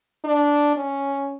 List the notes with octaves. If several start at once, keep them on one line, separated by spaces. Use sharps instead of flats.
D4
C#4